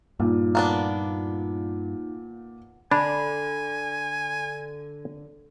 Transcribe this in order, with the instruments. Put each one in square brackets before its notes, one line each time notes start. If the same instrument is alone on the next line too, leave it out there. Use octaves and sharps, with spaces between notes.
[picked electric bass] G2 [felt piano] A#2 [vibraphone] D#4
[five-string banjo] A#3 B3 D4
[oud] D3 [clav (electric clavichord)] D4 [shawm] G#5 [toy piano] B5